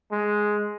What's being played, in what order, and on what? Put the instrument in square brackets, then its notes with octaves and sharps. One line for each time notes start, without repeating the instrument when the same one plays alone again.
[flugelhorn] G#3